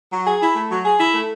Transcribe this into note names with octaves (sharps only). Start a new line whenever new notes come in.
F#3
G#4
E4
A3
F#3
G#4
E4
A3